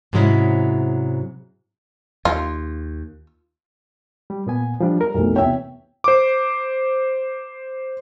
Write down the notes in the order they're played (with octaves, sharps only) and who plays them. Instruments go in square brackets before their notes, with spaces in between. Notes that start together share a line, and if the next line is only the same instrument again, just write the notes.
[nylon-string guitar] G#2 C3 F#3 G#3 C#4 E4
[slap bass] D#2 [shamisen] F4
[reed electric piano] G3
A#2 B3 G#5
F3 G3 D4
[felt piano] G3 [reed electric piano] A#4
[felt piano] B1 F2 A2
[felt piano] E2 C3 G5 [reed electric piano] C#5 E5
[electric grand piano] C5 D6